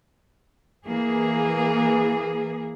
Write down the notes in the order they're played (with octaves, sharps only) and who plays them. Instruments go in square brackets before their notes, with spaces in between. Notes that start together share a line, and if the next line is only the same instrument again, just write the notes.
[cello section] E3 A#3 G#4